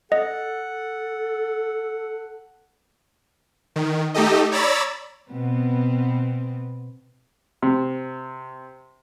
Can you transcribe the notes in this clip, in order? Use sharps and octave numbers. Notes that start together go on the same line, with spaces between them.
A4 D#5 F#5
D#3
A3 D#4 G4 A4 D#5
C#5 D5 A#5 B5 E6 A6
B2 B3 C4
C3